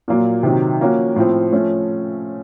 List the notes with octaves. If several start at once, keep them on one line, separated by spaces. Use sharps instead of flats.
A#2 F#3 A#3 F4
C3 D#3 F#3
F3 A#3 C#4 F#4
A2 F3 C4
F3 A3 C#4